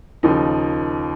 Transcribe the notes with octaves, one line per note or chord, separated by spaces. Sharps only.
D#2 C#3 F3 A#3 D#4